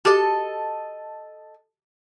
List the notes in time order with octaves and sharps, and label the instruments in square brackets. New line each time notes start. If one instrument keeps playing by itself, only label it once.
[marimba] F#4 G4 D6 [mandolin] A4 D#5